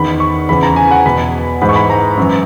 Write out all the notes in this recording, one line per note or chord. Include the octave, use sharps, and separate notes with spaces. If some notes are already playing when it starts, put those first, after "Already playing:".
Already playing: E2 D#3 B5
C#6
E2 C#3 E3 B5
A#5
G#5
F#5
E2 B2 B5
G#2 E3 B5
C#6
B5
A#5
F#2 E3